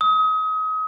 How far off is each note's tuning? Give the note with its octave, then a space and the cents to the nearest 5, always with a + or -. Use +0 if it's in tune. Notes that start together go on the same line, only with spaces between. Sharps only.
D#6 +35